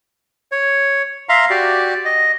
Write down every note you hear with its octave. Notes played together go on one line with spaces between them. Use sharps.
C#5
E5 F5 A#5 C6
F#4 G4 D5
D#5